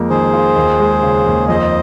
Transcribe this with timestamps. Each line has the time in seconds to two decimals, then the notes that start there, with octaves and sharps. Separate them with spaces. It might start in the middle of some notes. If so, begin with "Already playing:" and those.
Already playing: F2 G#3 A#3
0.10 D#3 G#4 C5
0.33 F4
0.56 D#2
0.80 G#3
1.03 C#3
1.26 D#2
1.48 F2 C5 D#5